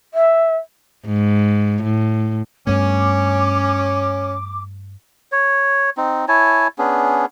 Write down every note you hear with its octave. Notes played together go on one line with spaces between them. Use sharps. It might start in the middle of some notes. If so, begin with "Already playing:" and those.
E5
G#2
A2
G2 A3 B3 C#4 D6
C#5
C4 D#4
E4 C#5 G#5 A5
B3 C#4 D4 G#4